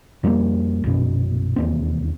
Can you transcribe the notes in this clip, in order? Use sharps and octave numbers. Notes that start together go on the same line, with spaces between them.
F2 G3 G#3 A#3
A#1 F#2 B2
E1 D#2 C4